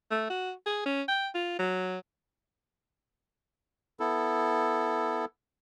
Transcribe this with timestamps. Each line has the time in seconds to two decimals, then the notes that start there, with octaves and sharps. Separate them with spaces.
0.11 A3
0.30 F#4
0.66 G#4
0.86 C#4
1.08 G5
1.34 F4
1.59 F#3
4.00 B3 E4 A4